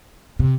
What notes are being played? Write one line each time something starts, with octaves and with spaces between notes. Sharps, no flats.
C3